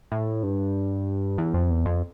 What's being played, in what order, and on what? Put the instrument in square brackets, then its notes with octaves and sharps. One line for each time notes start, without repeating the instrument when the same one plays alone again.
[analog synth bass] A2
G2
E2
F2
E2
F2